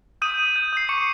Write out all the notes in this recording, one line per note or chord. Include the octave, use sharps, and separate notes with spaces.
D#6 G6 D#7
D#6
G6
D#6 C7
C#6 D6 C#7